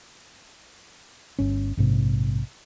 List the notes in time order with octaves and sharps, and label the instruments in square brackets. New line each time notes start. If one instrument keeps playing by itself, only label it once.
[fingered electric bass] G1 C#4
A#1 G#2 C3